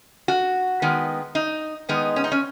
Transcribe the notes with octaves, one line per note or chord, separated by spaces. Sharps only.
F#4
D#3 G#3 B3
D#4
D#3 G#3 B3 D#4
C#4
D#4
C#4